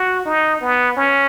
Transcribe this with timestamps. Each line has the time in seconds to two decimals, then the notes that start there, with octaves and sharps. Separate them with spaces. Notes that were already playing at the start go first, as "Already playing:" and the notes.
Already playing: F#4
0.25 D#4
0.61 B3
0.97 C#4